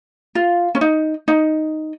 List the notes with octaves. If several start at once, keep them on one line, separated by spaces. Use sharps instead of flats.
F4
C#4
D#4
D#4